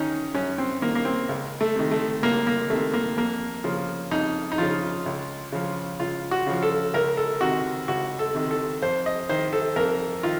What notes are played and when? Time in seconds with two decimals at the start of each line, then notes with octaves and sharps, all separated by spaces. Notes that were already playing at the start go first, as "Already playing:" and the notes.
Already playing: D#3 C#4 D#4
0.34 F#2 C#4
0.58 C4
0.82 D#3 A#3
0.95 A#3
1.05 C4
1.29 C#2
1.61 A3
1.76 C3 D#3
1.91 A3
2.23 C#2 A#3
2.47 A#3
2.70 C3 D#3 A3
2.94 A#3
3.17 F2 A#3
3.64 C#3 F3
4.11 F2 D#4
4.52 D#4
4.58 C#3 F3 F4
5.06 C#2
5.52 C#3 F3
5.99 C#2 F4
6.31 F#4
6.47 C#3 F3
6.63 A4
6.94 C#2 A#4
7.17 A4
7.41 C3 D#3 F#4
7.88 C#2 F#4
8.19 A4
8.35 C3 D#3
8.51 A4
8.82 F2 C5
9.06 D#5
9.29 D#3 C5
9.53 A4
9.76 F2 A#4
10.23 D#3 F4